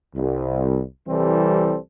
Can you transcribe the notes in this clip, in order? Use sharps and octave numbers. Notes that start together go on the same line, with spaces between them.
C2
C2 E3 G3 C4 A4